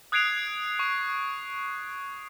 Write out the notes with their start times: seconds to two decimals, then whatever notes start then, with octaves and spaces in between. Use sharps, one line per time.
0.12 D#6 F#6 G#6 C7 D7 F7
0.79 C#6